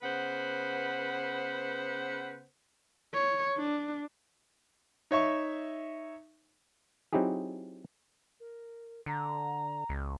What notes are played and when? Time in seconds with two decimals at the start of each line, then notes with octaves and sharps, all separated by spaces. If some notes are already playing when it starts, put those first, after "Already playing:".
0.02 C#3 B3 B4 C5 F#5
3.14 C#5
3.58 D4
5.11 D#4 C#5 E5 C#6
7.13 F#3 C4 D#4 E4 G4 G#4
8.40 A#4
9.06 D3 A#5
9.89 C#2